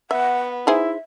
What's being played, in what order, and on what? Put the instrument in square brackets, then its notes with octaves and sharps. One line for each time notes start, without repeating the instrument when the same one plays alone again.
[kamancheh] B3 [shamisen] E5 [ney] F#5
[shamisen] D#4 G#4 C5 [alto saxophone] E4 [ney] E5